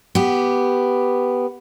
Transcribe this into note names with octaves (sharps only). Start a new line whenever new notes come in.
B3 G4